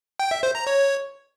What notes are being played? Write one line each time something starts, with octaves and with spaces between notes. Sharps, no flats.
G5
E5
C5
A#5
C#5